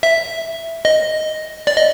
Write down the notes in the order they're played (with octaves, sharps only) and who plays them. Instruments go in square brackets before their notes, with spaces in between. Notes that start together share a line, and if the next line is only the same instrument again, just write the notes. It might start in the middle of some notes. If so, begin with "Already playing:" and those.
[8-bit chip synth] E5
D#5
D5
D#5